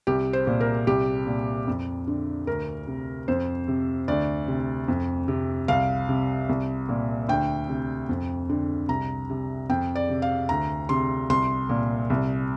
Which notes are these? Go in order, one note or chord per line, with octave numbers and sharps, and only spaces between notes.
C2 G4
C5
A#2
A#4
C2 G4
A#2
F2
D3
D2 A#4
C3
F2 C5
C3
D2 D5
C3
F2
C3
C2 F5
C3
C2
A#2
D2 G5
C3
F2
D3
C2 A#5
C3
F2 G5
D5
C3
F5
D2 A#5
C3 C6
C2 C6
A#2
C2